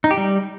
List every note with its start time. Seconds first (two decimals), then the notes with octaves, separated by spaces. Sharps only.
0.04 D#4
0.11 G4
0.17 G3